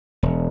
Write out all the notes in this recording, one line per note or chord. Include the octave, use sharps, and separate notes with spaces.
E1